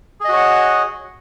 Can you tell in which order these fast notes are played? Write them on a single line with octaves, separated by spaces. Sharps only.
G#4 D#5 F#4 C#5 F#5